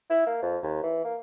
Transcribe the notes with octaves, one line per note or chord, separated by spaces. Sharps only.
E4
A#3
F2
D#2
E3
A#3